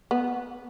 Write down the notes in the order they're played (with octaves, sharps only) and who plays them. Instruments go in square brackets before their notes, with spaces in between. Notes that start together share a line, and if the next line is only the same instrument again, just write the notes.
[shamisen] B3